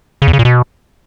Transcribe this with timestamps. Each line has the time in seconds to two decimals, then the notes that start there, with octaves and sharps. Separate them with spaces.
0.22 C#3
0.28 E2
0.33 C#3
0.39 A#2
0.45 B2